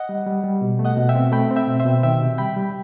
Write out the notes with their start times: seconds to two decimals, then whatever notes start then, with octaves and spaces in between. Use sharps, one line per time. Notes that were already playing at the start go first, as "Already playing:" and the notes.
Already playing: D#5 F#5
0.09 G3
0.27 G3
0.44 G3
0.61 B2
0.79 A3
0.85 D#5 F#5
0.97 B2
1.09 E5 G5
1.15 C4
1.32 A3 G5 B5
1.51 C4
1.56 E5 G5
1.68 B2
1.80 C5 E5
1.85 B2
2.03 D#3 E5 G5
2.21 C3
2.38 G3 G5 B5
2.56 G3